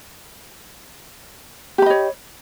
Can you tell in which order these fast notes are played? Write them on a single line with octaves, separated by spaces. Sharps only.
G4 B5 D#5 C#5